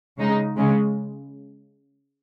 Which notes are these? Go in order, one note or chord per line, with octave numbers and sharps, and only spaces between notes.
C#3 G#3 D#4
C#3 G#3 C#4